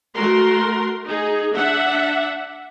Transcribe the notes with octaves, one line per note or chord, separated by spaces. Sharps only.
A3 F#4 A#4 C6
D#4 G#4
D4 E5 F#5